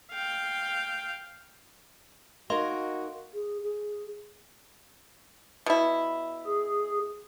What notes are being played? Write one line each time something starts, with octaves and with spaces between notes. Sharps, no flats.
F5 G5
A#3 D#4 F#4 A#4 D#5 F5 C6
G#4
G#4
B2 E4
G#4